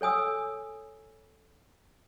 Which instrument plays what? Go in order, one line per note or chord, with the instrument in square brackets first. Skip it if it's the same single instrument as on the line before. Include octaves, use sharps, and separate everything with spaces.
[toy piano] A4 C#5 G#5 D#6 E6